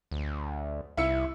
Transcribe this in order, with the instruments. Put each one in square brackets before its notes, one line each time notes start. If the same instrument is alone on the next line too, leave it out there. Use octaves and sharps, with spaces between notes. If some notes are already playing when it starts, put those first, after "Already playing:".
[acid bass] D2
[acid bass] C2 [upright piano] E4 E6 C#7